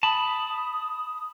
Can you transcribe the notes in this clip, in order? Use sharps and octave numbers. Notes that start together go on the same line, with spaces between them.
A5 B5 D#6